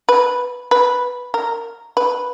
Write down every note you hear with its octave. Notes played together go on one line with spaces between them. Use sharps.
B4
B4
A#4
B4